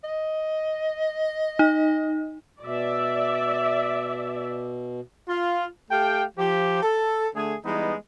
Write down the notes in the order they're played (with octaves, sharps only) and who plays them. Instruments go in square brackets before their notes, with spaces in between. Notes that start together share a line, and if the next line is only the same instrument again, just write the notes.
[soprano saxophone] D#5
[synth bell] D#4
[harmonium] B2 [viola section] D5 E5
[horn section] F4
A3 G4 F5 G5
F3 G4
A4
D3 A3 G#4
E3 G3 G#3 B3 D#4